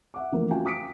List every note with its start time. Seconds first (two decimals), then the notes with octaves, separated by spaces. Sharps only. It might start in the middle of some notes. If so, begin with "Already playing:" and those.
0.14 E5 F#5 D6
0.32 E3 F3 G3 A3 A#3
0.50 C#4 F4 F#4 F5 G5 G#5
0.65 D6 D#6 B6 C#7 D7